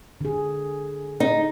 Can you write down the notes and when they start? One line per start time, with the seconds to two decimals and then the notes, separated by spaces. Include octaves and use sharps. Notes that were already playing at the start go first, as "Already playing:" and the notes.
0.21 D3 G#4
1.20 D#4